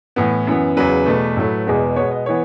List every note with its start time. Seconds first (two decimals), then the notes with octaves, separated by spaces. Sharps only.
0.16 A2 E3 B3
0.47 F#2 E3 B3
0.77 E2 C#3 F#3 B4
1.06 E2 B2 A3
1.37 A2 F#3 A3
1.66 E2 B2 G#3 B3
1.96 B2 G#3 B3 C#5
2.11 D#5
2.26 E3 B3 C#5